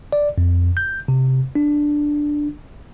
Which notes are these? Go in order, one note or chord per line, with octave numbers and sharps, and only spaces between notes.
D5
F2
G6
C3
D4